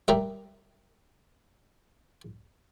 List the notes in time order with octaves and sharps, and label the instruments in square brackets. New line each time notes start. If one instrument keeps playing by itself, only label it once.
[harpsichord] G3 A#4 E5